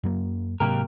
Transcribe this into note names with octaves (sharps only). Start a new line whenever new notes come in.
F#2 F#3 A#3
G#2 C3 F#3 A#3 G4 A#4